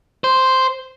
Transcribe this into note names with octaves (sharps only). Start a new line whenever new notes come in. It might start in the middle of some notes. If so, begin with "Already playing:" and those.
C5